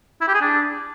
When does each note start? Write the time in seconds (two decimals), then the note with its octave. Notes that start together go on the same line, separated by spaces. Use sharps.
0.21 E4
0.28 G4
0.34 G#4
0.41 D4